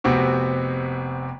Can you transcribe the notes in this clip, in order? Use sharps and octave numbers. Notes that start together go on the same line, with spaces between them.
F1 C3 B3 C4 F#4